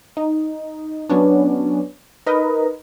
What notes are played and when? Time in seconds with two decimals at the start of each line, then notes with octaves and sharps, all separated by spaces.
0.17 D#4
1.09 F#3 B3 C#4 D4
2.26 D#4 A#4 B4 D#5